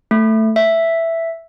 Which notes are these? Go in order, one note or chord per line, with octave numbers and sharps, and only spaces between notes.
A3
E5